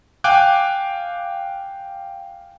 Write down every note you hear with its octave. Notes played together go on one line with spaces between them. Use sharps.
F5 G5 G#5 D6 F#6